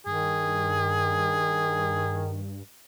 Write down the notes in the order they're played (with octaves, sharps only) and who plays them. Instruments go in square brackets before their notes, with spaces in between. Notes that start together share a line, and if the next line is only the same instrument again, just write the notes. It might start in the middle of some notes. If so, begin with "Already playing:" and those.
[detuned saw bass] G2 [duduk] D#3 [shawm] G#4